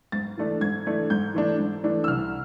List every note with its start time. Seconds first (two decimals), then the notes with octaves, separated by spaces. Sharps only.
0.12 G#2 A6
0.38 E3 A3 D4
0.61 G#2 G#6
0.86 E3 A3 D4
1.10 G#2 G6
1.34 E3 A3 D4
1.59 G#2
1.84 E3 A3 D4
2.04 E6
2.08 C2 F6